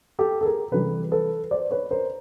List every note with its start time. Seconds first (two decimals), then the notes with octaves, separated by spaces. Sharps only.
0.19 G4 A4
0.41 A4
0.45 G#4 A#4
0.71 C3 E3 G3 A4 B4
1.12 A4 B4
1.51 C5 D5
1.71 B4 C#5
1.91 A#4 C5